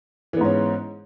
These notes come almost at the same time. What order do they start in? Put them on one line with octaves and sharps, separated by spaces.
E3 B3 G#2 C#4